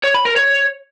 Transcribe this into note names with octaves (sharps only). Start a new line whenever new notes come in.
C#5
B5
A#4
C#5